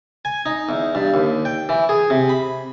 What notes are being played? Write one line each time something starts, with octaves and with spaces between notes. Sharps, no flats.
G#5
D#4
E2
G2
D#2
G5
E3
G#4
C3
B5